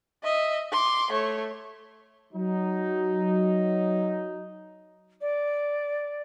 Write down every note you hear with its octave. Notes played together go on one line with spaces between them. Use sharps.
D#5 E5
C6 D6
A3 C#5
F#3 D#4
D5